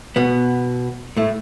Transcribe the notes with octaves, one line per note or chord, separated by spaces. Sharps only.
B2 B3
A2 A3